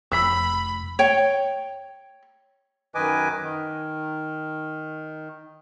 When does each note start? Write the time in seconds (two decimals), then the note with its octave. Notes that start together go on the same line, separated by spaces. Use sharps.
0.12 F1 B5 E6 B6
0.99 C#5 G5
2.95 F#2 D#3 B4 D#5 G#5 D6
3.41 D#3